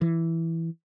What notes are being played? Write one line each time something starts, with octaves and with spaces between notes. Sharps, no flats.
E3